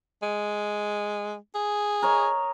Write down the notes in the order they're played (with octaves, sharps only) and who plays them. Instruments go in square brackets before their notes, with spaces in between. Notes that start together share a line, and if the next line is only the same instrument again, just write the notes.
[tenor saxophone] G#3
G#4
[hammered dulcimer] A#4 C#5 D#5